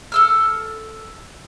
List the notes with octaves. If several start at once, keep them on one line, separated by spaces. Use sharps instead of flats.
A4 E6 F6